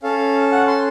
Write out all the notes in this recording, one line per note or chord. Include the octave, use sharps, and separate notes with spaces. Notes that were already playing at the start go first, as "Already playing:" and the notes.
C#4 A4 F5
F#5
C6